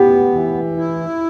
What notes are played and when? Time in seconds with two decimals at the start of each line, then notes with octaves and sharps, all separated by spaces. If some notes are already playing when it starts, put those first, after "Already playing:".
Already playing: B3 G4
0.32 E3
0.77 E4